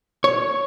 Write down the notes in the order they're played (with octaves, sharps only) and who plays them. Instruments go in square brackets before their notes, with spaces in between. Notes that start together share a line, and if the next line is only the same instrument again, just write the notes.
[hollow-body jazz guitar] C#5